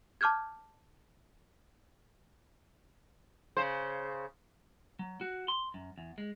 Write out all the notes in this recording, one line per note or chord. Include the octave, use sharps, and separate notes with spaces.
A5 D6 F6 G6 G#6
C#3 C5
F#3
F#4
C6
F#2
E2
G#3